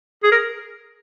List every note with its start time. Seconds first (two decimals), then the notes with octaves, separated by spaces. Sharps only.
0.23 G#4
0.32 A#4